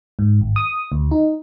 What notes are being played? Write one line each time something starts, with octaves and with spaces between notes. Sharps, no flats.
G#2
G#1
D#6
D2
D#4